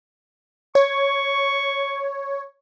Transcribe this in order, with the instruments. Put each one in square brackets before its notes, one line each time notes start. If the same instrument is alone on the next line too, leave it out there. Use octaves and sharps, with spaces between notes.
[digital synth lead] C#5 [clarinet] C#6